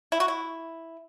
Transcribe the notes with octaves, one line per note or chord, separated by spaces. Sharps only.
E4
F#4
E4